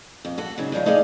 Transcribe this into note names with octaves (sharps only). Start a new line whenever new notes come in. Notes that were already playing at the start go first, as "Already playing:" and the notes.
F2
F#4 A4 F#5
G#2 C#3 F#3
C#3 F3 G3 G#3
A3 D#4 G#4 D5 F5